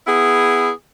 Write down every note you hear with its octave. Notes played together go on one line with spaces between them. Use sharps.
B3 E4 G#4